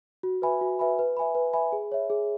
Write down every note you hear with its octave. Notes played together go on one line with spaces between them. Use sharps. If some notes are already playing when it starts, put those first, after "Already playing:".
F#4
B4 E5 G#5 B5
F#4
B4 E5 G#5 B5
B4
E5 G#5 B5
B4
E5 G#5 B5
G#4
C#5 E5
G#4